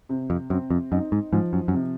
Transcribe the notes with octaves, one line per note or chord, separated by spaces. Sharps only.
C3
F2
F#2 C4
F2
F#2 D#4
G#2
G#2 F3
F#2
F#2
C3